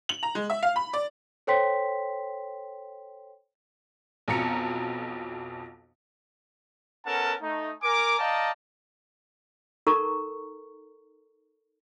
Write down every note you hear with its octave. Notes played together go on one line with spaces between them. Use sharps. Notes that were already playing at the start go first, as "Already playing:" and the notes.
F#7
A#5
G#3
E5
F5
B5
D5
A4 C5 C#5 G5 C6 B6
B1 F2 B2 A#5 C#7
B3 C#4 A4 A#4 F#5 A5
A3 D#4
A#4 G#5 D6
D5 D#5 F5 G5 A5 A#5
D#4 A4 A#4 A#5 C#6